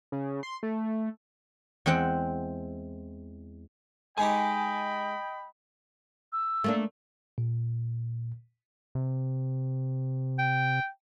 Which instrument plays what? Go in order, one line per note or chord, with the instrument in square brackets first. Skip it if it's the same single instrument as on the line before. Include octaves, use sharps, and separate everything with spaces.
[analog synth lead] C#3
C6
A3
[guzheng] E2 G#3 C4 F#5 G5
[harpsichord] G#3 D#4 G4 [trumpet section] D#5 G5 B5 [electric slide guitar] G#5
[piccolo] E6
[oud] A3 A#3 D4
[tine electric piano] A#2
[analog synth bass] C3
[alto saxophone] G5